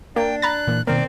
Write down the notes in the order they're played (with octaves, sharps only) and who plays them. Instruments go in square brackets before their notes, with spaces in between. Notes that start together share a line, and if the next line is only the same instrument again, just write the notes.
[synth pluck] A#3 [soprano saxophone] D4 [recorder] G5
[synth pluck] A#5 B5 A6 [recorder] F#6
[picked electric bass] A#2 E3 A#3
[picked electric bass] B2 D#3 A#3 [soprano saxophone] C4 [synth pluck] A#4 [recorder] D5